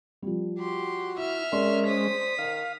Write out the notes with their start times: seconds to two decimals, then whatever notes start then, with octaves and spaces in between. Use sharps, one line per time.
0.22 F3 G3
0.58 F#4 G4 C6
1.18 E4 E5 F6
1.52 G#3 C#4 A#4 D5 C6
1.86 C5 D#6 B6
2.38 D#3 F5